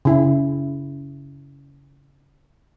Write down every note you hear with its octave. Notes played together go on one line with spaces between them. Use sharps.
C#3 E4